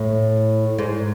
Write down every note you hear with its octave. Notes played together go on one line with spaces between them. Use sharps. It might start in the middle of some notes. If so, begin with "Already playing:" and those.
Already playing: A2
G#2